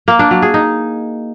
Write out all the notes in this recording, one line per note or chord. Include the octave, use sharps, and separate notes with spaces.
A#3
D4
F#3
G#4
D#4